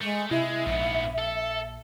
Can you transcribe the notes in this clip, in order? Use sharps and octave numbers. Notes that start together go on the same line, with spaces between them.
G#3 A3
C3 G#3 E4 E5
A#1 G#2 B3
A4